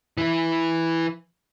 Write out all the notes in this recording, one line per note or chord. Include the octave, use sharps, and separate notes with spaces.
E3 E4